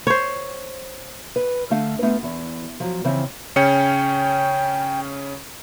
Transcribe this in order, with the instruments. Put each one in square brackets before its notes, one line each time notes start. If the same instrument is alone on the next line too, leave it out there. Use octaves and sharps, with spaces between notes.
[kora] C5 C#5
[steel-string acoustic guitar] B4
D3 A3 F5 A5
A3 B3 F4
E2
F3 F#3
C#3 E3 F3 C4
[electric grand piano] C#3 C#4 C#7 [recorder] G5